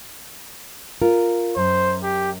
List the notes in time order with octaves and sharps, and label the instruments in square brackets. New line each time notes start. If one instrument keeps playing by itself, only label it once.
[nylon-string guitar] F4 A#4
[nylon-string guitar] F#2 [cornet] C5
[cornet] G4